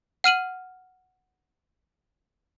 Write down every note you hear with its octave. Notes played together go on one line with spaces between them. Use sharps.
F#5 F6 D#7 F#7